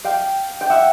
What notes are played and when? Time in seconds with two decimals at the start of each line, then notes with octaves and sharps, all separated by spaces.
0.04 F5 G5
0.61 G5
0.70 E5 F#5